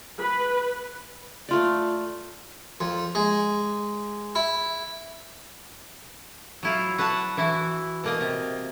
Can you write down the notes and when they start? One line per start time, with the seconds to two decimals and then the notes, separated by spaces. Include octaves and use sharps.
0.21 B4
1.49 A3 F4 D5
2.80 F2
3.15 G#3
4.35 E4
6.63 F#3 E4 F4
6.98 F#4 B4 F#5 A5
7.37 E3 E4 F#4
8.04 B2 A#3 D#5
8.20 C3